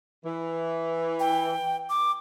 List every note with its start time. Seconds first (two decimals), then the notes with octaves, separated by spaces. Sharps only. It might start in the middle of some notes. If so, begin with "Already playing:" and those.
0.25 E3
1.20 G5
1.90 D6